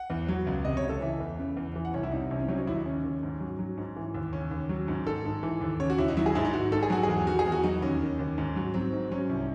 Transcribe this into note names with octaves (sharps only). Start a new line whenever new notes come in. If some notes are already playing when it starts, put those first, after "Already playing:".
Already playing: F#5
E2
F#3
C#2
C3 D#5
C#5
C#2
A4
E3 E5
E2
C#3
E2
E3
F#5
C2 C#5
E4
C3 D#4
C2 C#4
C4
F#3 C#4
D#4
D#2 E4
D#4
C#3 C#4
D#2
G#2
F#3
F#3
G#2
E3
D#2
C#3 C#4
D#2
F#3
G#2
D#3 A4
G#2
E3
D#2
C#3 C#5
F#4
D#2 E4
D#4
F#3 E4
G#4
G#2 E4
D#4
D#3 F#4
G#2 A4
G#4
F#3 F#4
E2 G#4
D#3 F#4
G#4
E2
F#4
F#3 D#4
D#2 C#4
D#3
D#2
G#2
F#3
F#3 C4
G#2
F#3 C#4
C2